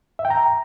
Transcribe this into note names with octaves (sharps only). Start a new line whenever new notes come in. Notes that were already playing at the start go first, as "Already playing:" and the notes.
E5
G5
A#5